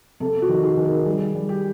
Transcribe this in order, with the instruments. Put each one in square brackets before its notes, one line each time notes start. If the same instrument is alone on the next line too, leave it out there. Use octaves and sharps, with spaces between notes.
[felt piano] C3 A4
F#4
D#3
G#4
D#3
A#4
G3 G#4
G3
G4